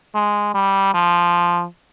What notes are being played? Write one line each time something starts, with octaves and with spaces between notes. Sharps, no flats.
G#3
G3
F3